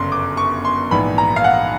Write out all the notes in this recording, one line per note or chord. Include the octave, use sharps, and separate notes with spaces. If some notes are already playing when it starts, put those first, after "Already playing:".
Already playing: G1 F#2 C#3 C6
D6
C#6
C6
A#1 G#2 E3 B5
A#5
F5
F#5